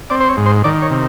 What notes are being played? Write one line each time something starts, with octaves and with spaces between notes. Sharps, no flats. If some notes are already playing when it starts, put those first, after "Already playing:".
C4 D5
C5
C#5
G#2
C5
D#3 D5
C#5
C3